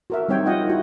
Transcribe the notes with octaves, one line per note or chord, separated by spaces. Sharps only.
F#4 A#4 E5
G3 C4 D#4 C#5 G5
F4 D#5 F5 F#5
D#4 E4 F#4